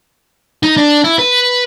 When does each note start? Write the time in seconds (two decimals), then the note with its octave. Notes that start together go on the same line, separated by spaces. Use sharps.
0.63 D#4
0.77 D4
1.04 E4
1.19 B4